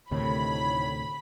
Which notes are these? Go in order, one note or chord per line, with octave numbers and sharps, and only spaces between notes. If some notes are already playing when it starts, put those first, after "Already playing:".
D2 A2 C3 D#3 C#5 B5